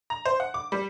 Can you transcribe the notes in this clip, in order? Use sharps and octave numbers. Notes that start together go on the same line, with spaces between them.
A#5
C5
F#5
D6
G3